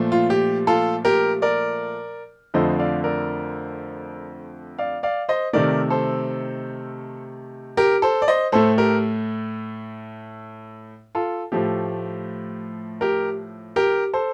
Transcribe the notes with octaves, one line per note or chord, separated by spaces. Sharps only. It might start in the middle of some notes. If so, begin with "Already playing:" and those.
Already playing: A#2 F3 A3
F4
G4
F4 A4
G4 A#4
A#4 D5
F2 D3 F3 A3 C5 D#5
D5 F5
A#4 D5
D5 F5
D5 F5
C5 D#5
C3 D#3 A3 A#4 D5
A4 C5
G4 A#4
A4 C5
D5
C5 D#5
A2 A3 A4 C5
G4 A#4
F4 A4
A2 F3 A3 G4
G4 A#4
G4 A#4
A4 C5